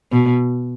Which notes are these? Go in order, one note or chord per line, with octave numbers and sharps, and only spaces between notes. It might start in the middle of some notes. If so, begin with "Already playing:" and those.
B2